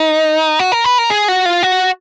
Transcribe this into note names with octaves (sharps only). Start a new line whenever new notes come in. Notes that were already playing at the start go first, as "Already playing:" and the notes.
Already playing: D#4
F#4
A#4
B4
A#4
G#4
F#4
F4
F#4